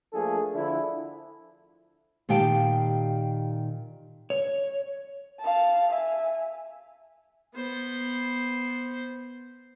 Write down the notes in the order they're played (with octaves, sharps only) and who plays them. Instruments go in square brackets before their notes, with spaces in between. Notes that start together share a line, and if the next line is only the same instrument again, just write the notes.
[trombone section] F3 A3 A#3 D4 G#4 A4
D3 F3 D4 E4
[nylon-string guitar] A#2 D#3 G4 F5 G5 A5
[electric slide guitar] C#5
[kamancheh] F5 A5
E5 G#5
[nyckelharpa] B3 C5